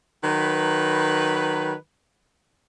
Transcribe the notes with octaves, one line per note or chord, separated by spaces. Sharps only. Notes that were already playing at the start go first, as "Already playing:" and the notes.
D#3 F#3 B4